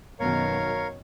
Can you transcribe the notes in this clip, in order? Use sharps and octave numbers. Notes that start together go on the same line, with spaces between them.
F#2 B2 D#3 A#4 C#5 F5